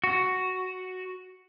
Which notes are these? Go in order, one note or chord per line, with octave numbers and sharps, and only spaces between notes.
F#4